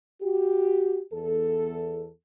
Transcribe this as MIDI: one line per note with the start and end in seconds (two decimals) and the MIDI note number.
0.22 1.00 66
0.22 1.00 67
1.13 2.09 40
1.13 2.09 69